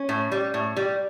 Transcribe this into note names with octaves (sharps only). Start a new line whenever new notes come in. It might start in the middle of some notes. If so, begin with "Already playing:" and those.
Already playing: C#4
A2
G3
A2
G3